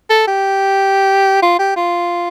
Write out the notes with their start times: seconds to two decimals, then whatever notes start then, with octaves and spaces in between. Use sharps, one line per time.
0.10 A4
0.27 G4
1.43 F4
1.59 G4
1.76 F4